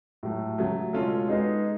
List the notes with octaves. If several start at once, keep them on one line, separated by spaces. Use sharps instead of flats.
A2 F#3 A3
C#3 F#3 A3
B2 G#3 C#4 F4 A4
G#3 B3 D#4 G#4